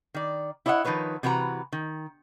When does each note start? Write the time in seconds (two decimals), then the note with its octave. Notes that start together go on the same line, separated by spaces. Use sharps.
0.14 D#3 D5
0.66 E4 C#5 D#5 E5 F#5
0.84 D#3 F3 D#4 B4 C#5
1.23 C3 E3 F#4 B4 A#5
1.72 D#3